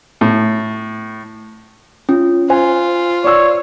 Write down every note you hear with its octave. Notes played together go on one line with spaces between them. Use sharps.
A2
C#4 F4
F4 C5 G#5
C#5 D5 E6